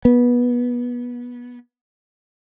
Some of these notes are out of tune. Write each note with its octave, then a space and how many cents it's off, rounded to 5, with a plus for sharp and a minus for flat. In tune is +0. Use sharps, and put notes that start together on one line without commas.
B3 -20